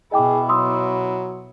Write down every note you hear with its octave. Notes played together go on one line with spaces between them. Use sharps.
B2 E4 G#4 D#5 G5 D6
F#3 C6 D#6 E6